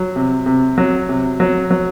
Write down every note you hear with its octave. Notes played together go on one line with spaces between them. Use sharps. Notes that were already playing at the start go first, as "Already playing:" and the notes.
Already playing: F#3
C3
C3
F#3
C3
F#3
F#3